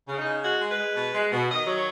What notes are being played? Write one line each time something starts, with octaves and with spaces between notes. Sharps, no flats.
C#3
D#4
C#3
G#3 F#4
G#3
B4
G#3
B2
G#3
B2
D#3 D#5
F#3
C#5